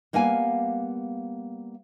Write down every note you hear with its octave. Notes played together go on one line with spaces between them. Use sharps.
G3 A#3 B3 F5 G#5